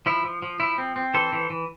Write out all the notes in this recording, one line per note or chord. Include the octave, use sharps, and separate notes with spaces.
F3 E4
F3
F3
F3 E4
C4
C4
E3 A4 C5
E3
E3